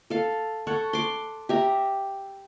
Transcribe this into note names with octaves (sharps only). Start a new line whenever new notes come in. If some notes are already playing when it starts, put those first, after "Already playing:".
A4 F5
A4 C#5 F#5
C6 D6
G4 E5 A#5